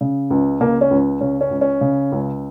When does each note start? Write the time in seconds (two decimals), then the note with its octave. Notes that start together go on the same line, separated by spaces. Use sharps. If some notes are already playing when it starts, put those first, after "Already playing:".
0.01 C#3
0.30 C#2
0.61 C#3 A#3
0.81 C#4
0.91 C#2
1.21 C#3 C#4
1.41 C#4
1.51 C#2
1.61 C#4
1.81 C#3
2.12 C#2